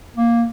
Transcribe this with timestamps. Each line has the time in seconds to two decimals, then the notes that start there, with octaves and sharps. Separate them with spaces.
0.17 A#3